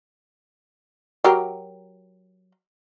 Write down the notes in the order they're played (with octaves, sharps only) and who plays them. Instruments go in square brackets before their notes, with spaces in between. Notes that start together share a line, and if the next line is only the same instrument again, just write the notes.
[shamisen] F#3 G4 A#4